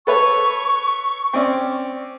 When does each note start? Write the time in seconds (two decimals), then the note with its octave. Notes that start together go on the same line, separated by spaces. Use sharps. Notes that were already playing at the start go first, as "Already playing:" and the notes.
0.07 A4 B4 C#5 C#6
1.33 C4 C#4 D5